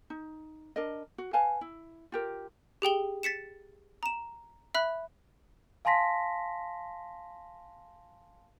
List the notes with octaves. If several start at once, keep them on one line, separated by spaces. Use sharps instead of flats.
D#4
D4 A#4 D#5
F#4
B4 F5 G#5 A5
E4
F4 G4 A#4
G4 G#4 G5 G7
A6 B6 C#7 E7
A#5 E7
E5 B5 F#6
F5 G#5 A5 C6 A#6 B6